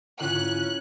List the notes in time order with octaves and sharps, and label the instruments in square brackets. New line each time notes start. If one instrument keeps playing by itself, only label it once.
[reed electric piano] G#2 D3 [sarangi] C#4 [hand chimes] E4 F4 [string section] F#6